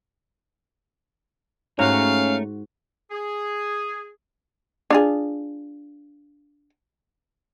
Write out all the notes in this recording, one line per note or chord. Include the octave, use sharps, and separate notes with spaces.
G#2 A3 C#4 F#4 C#5 F5 A#5
G#4
D4 F4 G#4